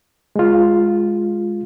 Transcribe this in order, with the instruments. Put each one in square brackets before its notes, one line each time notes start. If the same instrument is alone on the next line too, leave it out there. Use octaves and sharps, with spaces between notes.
[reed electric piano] G#3 F4